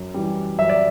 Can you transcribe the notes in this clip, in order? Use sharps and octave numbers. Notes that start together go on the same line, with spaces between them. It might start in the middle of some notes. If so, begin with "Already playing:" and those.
Already playing: F#2
E3 G3
F#2 E5
D5